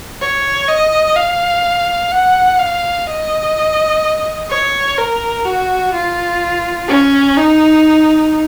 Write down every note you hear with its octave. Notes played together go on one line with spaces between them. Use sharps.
C#5
D#5
F5
F#5
F5
D#5
C#5
A#4
F#4
F4
C#4
D#4